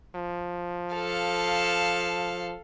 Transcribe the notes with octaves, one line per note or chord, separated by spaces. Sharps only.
F3
A4 F5